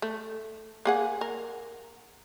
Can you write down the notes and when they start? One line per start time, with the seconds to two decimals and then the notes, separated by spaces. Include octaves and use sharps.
0.02 A3
0.85 A#3 G#4 F#5
1.21 A#4